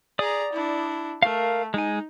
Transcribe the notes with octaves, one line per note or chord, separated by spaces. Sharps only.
G#4 D5 A#5 D#6
D4 E4
A3 A#4 F5
G#3 D#4 G#5